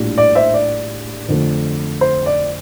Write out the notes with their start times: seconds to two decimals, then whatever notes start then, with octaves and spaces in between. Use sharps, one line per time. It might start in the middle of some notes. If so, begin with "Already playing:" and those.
Already playing: A#1 A2 G3 D4
0.18 D5
0.35 C5 E5
0.54 D5
1.28 F2 D3 A3
2.01 C5
2.26 D5